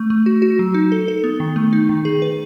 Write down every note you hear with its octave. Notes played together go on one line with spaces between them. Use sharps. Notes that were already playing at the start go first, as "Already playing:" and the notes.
Already playing: A3
A3
F#4
F#4
F#3
D#4
A4
A4
B3
D#3
A3
D#4
D#3
G#4
B4